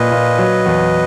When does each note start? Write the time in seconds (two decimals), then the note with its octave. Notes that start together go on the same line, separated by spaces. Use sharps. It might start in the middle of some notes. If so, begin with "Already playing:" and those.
Already playing: A#2 A#3 B4 D#5
0.11 A#2
0.38 F#3
0.66 E2